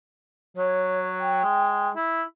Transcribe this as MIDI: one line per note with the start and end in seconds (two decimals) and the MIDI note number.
0.57 1.43 54
0.57 1.08 73
1.20 1.89 79
1.44 1.90 56
1.96 2.22 64